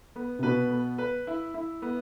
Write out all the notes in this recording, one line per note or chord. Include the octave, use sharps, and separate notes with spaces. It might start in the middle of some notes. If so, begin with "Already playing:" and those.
B3
C3
B2 B4
B3
B4
E4
E4
B3